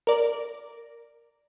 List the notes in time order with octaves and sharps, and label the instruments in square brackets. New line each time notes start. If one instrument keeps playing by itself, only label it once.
[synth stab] A#4 D5